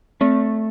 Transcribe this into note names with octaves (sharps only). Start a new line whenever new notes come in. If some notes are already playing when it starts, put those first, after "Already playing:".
A3 C4